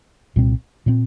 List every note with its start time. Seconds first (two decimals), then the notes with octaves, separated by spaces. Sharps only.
0.36 C2 A#2 G3 C4
0.86 A#2 G3 C4